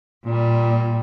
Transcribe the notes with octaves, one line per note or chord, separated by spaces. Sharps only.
A#2 G3